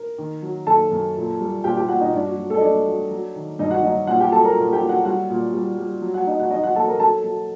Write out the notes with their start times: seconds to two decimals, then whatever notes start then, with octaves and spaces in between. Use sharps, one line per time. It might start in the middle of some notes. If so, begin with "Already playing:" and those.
Already playing: A#4
0.18 D#3
0.42 F#3
0.67 F#2 A4 A5
0.91 F#2
1.16 A#2
1.41 G3
1.64 A#2 G4 G5
1.77 G4 G5
1.88 A#2 F#4 F#5
2.00 D#4 D#5
2.13 G2 D4 D5
2.25 F#4
2.38 F#3
2.49 A3 A4
2.57 D#5
2.61 F#3 D4 D5
2.86 F#3
3.11 F#3
3.35 D#3
3.59 G2 D#4 D#5
3.71 F#4 F#5
3.83 F#3 D#4 D#5
4.07 A#2 F#4 F#5
4.20 G4 G5
4.32 F#3 A4 A5
4.44 A#4 A#5
4.56 A#2
4.73 G4 G5
4.81 F#3
4.89 F#4 F#5
5.05 G3 F#4 F#5
5.30 A#2
5.54 G3
5.78 G3
6.02 F#3
6.14 F#4 F#5
6.27 F#3 D#4 D#5
6.40 F#4 F#5
6.51 F#3 D#4 D#5
6.63 F#4 F#5
6.76 F#3 A4 A5
6.88 A#4 A#5
6.99 F#3 A4 A5
7.24 F#3